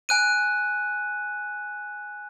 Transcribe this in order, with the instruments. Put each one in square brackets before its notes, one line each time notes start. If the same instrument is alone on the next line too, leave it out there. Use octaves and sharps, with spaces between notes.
[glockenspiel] G#5 F#6 D#7